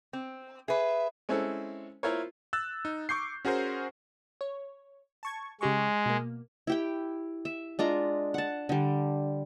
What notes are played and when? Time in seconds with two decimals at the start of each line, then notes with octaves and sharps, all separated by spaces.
0.13 C4
0.68 G#4 B4 E5
1.29 G#3 C4 C#4 E4 A4
2.03 E4 F4 A#4 C5 C#5
2.53 E6 F#6 A6
2.85 D#4
3.09 C#6 D6 G6 C7
3.45 C#4 F#4 G#4 A#4 C5
4.41 C#5
5.23 A5 C#6 G#6
5.61 C#3 G#3 G4 C#6
6.06 B2 A#3
6.67 E4 G4 G5
7.45 E5
7.79 G#3 D4 F4 A#5
8.34 F#5 A5
8.69 D3 G3